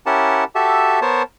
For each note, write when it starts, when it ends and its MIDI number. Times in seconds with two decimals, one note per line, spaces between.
0.06 0.44 61
0.06 0.44 64
0.06 0.44 67
0.06 0.44 70
0.06 0.44 78
0.06 0.44 81
0.55 1.00 66
0.55 1.00 67
0.55 1.00 69
0.55 1.00 76
0.55 1.00 81
1.02 1.23 59
1.02 1.23 70
1.02 1.23 72
1.02 1.23 73
1.02 1.23 81